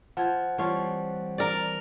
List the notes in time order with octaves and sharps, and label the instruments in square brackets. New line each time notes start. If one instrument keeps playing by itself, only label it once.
[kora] F3 [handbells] F#5 G#6
[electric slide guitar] E3 G3 C4 [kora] F3 C#5 F5
[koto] A#4 D5